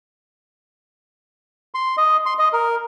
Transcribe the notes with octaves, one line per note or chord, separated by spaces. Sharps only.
C6
D#5
C6
D#5
A#4